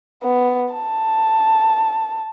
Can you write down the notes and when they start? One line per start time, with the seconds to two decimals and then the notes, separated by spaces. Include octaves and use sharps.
0.23 B3
0.74 A5